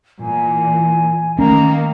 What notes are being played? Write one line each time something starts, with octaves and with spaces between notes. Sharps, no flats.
A#2 E3 G#5
D#3 A3 A#3 C#4 A#5